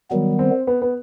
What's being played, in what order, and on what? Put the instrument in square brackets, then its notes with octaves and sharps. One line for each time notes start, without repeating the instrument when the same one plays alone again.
[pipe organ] D#3 G3 B3 [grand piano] F#3
[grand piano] C4
B3
B3